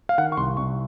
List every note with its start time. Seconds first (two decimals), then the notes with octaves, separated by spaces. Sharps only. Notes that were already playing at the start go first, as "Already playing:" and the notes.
0.09 F5
0.18 D#3 F#5
0.32 C#6
0.37 C2 C6
0.57 C2 C#6